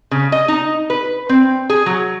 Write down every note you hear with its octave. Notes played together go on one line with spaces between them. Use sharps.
C#3
D#5
D#4
B4
C4
G#4
F#3